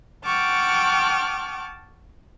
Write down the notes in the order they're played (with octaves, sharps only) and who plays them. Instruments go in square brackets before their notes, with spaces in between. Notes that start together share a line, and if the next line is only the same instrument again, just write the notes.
[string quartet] F#5 G5 A5 C#6 D6 F6